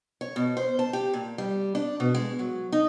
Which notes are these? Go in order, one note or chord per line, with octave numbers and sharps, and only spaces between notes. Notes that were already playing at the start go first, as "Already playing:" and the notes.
C#5
B2
C5
A5
G4
A#2
G3
D4
B2
G#3
F#3
D#4